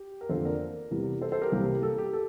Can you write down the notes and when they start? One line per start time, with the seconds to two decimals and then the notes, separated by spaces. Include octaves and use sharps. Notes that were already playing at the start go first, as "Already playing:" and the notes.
Already playing: G4
0.21 A#4
0.29 F2 D3 F3 A#3 A4 C5
0.45 A#4 D5
0.91 E2 C3 E3 G3
1.21 A4 C5
1.32 A4 C5
1.42 G4 A#4
1.52 C2 C3 E3 G3 A#3
1.83 A4
1.98 G4
2.13 A4